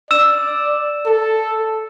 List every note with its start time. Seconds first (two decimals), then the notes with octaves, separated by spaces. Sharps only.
0.11 D5 E6 E7
1.06 A4